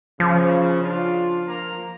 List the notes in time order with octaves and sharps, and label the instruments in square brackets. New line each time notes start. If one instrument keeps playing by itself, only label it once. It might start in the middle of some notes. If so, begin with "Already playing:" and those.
[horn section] C#3 [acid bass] F3
[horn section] D4 F4
A#3 A#5